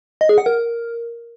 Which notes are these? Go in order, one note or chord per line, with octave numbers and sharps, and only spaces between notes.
D#5
G#4
F#5
A#4